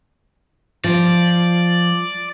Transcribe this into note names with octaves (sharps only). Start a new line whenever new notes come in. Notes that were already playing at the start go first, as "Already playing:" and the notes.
F3 D5